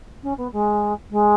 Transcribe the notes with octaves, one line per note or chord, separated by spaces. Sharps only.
C#4
B3
G#3
G#3